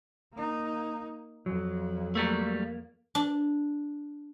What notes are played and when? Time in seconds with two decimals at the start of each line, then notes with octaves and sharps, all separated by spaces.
0.34 A#3 D#4
1.46 F2 F#3
2.15 F#3 G3 A3 A#3
3.15 D4